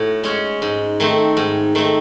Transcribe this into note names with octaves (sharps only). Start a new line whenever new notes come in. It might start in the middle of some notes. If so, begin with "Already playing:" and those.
Already playing: A2 F#4
G#3 C#4 F#4
G#2
D#3 A3 C4
G#2
D#3 A3 C4